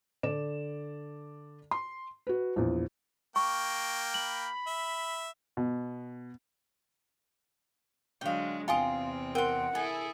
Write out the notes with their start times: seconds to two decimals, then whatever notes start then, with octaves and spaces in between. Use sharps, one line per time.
0.23 D3 D5 E7
1.71 C6
2.27 F#4 B4
2.56 A#1 E2
3.36 A#3 G5 C#6
4.14 B5 F#7
4.67 E5
5.57 B2
8.21 D3 F#3 G#3 F5 G5
8.68 E2 C3 C4 F4 G5 G#5 C6 D#6
9.35 A#4 F#5 G5 C6
9.75 E4 G#4 A4 G#5